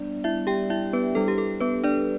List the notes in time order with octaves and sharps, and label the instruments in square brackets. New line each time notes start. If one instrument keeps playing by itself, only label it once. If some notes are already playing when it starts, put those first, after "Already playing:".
Already playing: [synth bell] G3 B3 D4 D5
E4 E5
G4 G5
E4 E5
B3 B4
G3 D4 A4
G4
A4
B3 B4
D4 D5